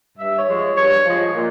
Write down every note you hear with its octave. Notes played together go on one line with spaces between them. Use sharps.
G2 E5
C#5
F3 G#3
C#5
G2 C#5
F3 G#3
A#2